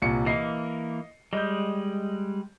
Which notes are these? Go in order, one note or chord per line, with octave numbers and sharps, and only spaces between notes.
C2 A#2 C#7
E3 A#3 D#5 C7
G3 G#3 D#5 G6